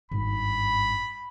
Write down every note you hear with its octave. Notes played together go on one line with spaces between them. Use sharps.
G#1 G2 B5